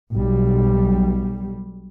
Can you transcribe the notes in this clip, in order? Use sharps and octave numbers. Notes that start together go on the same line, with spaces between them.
B1 G3